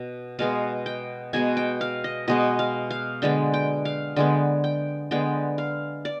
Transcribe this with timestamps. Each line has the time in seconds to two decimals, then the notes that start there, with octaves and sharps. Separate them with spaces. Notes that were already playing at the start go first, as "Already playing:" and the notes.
Already playing: B2
0.39 B2 G#3 B3 F5
0.86 G5
1.33 B2 G#3 B3 G#5
1.57 G5
1.81 F5
2.04 D#5
2.28 B2 G#3 B3 D#5
2.59 F5
2.90 F5
3.22 D3 G#3 B3 G5
3.54 G5
3.85 F5
4.16 D3 G#3 B3 G5
4.64 G5
5.11 D3 G#3 B3 G5
5.58 F5
6.05 D5